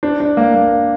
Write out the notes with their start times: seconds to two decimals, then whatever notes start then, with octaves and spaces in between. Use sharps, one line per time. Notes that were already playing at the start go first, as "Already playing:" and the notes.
0.03 D4
0.20 D4
0.37 A#3
0.55 A#3